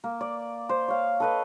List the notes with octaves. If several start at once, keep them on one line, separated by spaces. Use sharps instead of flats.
A#3
D5
C5
C#5 F5
A4 B4 D#5